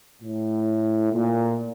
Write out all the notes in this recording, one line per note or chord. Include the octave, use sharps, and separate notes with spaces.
A2
A#2